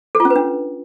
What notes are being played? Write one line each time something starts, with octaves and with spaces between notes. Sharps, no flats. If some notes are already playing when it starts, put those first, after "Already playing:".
A4
F4
C#4
B4
D4